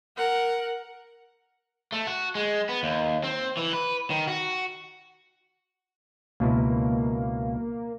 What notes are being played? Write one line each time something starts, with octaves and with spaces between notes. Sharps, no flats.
A#4 F#5
A3
F#4
G#3
B3
D#2
C4
E3
B4
D#3
F#4
C#2 B2 A#3 E4